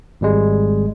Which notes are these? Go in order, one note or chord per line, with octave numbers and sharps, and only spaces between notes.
G#1 G3 G#3